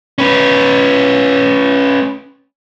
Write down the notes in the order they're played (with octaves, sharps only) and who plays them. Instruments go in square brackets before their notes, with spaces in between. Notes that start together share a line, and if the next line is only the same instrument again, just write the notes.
[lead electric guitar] C#4 B4